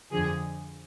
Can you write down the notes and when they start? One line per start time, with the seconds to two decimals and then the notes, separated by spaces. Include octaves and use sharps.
0.11 F2 D3 F3 G#4